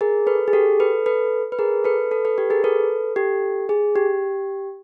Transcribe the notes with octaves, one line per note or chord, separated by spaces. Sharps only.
G#4 A#4
A4 B4
G#4
G4 A4
A4 B4
A4 B4
B4
G#4 A#4
A4 B4
A4 B4
A4 B4
G4 A4
G#4 A#4
A4 B4
G4 A4
G#4
G4